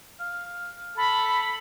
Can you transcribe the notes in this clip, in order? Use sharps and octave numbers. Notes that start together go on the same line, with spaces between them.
F5
A4 B5